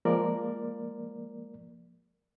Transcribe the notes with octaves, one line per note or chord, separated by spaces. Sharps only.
F3 G#3 A#3 A#4 D5